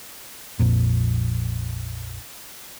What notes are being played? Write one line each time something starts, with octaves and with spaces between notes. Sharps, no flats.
A#1 F2 A#2